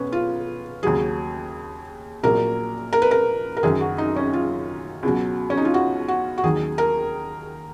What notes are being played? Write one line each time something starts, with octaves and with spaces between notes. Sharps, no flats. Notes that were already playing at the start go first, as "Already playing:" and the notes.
Already playing: B1 B3 C#4
F4
D#2 C#3 F#3 G#4
A#1 A#2 F#3 A#4
A#4
B4
A#4
A#4
F#1 F#2 D#3 F#3 G#4
F#4
D#4
C#4
F4
C#2 B2 F#3
C#4
D#4
F4
F#4
F#4
F#4
D#2 D#3 F#3 G#4
A#4